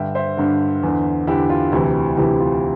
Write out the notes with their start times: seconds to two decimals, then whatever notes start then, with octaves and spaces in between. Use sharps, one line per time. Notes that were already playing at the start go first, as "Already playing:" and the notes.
Already playing: G2 D3 E5 G5
0.15 C5 E5
0.37 G2 D3
0.83 E2 D3
1.27 E2 D3 E4 G4
1.49 F4
1.72 D2 C3 E3 E4 G4
2.17 D2 C3 E3 E4 G4
2.40 F4